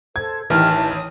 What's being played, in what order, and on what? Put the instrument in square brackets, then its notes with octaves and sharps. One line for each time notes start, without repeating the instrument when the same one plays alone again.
[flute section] A4 C5 [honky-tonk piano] G#6
[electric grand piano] A1 D#3 [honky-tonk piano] E3 [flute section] G4 G5 F6 [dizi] A5
[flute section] C#5
[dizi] D#6